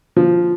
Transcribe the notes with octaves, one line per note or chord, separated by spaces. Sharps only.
F3